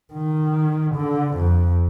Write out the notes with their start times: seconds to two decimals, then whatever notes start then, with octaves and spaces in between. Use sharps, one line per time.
0.14 D#3
0.95 D3
1.35 F2